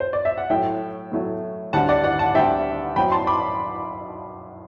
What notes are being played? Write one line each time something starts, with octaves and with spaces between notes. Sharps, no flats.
C5
D5
E5
F#5
A2 F#3 A3 E5 G5
A2 F#3 A3
D2 D3 G3 C4 F#5 A5
D5 F#5
D5 F#5
F#5 A5
D2 D3 G3 C4 E5 G5
F#2 F#3 C4 G5 B5
A5 C6
B5 D6